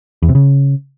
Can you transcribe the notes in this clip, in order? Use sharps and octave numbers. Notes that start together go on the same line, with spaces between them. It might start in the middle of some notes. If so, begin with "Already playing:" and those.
E2
C3
C#3